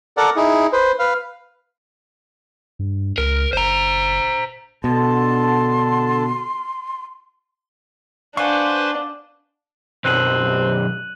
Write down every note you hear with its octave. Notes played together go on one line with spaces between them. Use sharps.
A4 A#4 D5 F#5
D#4 E4 G#4
B4 C5
B4 F5
G2
C#2 A#4
F#1 C5 A#5
B2 D3 A5 C6
D4 B4 C5 F5 F#5 G#5 C6 C#6
B1 F#2 C4 F#6 D#7 F#7